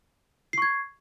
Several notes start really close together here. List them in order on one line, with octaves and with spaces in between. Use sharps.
C7 C#6 G#6